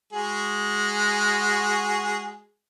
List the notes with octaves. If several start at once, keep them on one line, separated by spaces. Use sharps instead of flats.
G#3 F#4 G#4